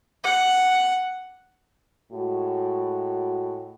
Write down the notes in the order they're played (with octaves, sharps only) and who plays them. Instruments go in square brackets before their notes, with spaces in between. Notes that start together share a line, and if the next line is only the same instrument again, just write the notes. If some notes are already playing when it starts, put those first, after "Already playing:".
[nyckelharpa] F#5
[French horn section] A2 G#3 F#4